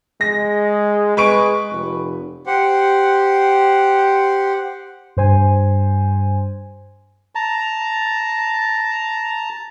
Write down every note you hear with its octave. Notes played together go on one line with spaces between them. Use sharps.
G#3 A#6
G#3 B4 C#6 D7
F1
G4 C5 F#5
G2 C5 G#5
A5 A#5